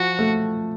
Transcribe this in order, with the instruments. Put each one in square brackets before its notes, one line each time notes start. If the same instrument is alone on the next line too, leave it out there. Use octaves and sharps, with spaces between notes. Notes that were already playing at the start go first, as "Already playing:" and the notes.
Already playing: [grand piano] F3 [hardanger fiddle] F#4
[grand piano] A3